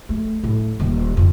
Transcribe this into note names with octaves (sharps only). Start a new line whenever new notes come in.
A3
A2
D#1 D#3
F2 D3